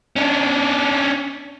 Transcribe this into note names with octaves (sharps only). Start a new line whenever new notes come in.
C#4 D4